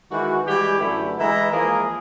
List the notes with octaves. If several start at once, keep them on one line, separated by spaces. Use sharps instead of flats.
D#3 E3 G#3 F#4
E3 G3 G#3 G4
F#2 D3 E3 A3 E4
E3 G#3 B4 E5 A#5
E3 F3 G#3 A#3 G#4 A#4